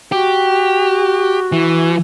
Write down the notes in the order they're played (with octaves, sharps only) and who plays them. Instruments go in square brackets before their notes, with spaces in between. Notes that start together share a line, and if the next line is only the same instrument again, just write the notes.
[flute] F#4 [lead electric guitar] G4
[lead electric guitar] E3